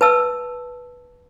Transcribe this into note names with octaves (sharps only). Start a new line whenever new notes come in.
B4 A5 E6